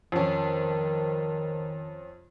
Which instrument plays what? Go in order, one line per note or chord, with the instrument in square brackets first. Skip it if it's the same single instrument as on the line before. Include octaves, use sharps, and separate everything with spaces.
[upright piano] F2 C#4 [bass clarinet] D#3